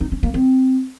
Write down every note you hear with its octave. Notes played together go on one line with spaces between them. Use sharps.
D#4
C#4
A#3
C4